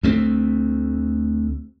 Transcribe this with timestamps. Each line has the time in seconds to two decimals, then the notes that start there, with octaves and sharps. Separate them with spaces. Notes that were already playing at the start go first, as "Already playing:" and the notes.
0.03 D2 A3 C4